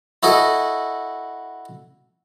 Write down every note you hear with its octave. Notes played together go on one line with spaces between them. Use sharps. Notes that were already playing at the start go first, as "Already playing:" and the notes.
E4 F#4 A4 D#5